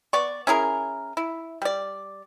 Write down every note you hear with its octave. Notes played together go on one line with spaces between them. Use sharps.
B3 D5 C#6
C#4 E4 G#4 A#4
E4
G3 D5